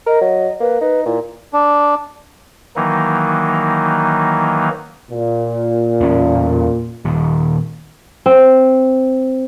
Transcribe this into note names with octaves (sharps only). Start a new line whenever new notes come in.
A#4 D#5
F#3
A#3 B4
D#4 B4
A#2 E4
D4
D#3 E3 F#3 A#3 D#4
A#2
E2 C#4
D#1 D#2
C4